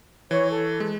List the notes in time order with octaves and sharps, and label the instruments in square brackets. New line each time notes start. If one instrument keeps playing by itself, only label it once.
[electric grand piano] E3 [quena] C#5
[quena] A4
[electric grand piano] G#3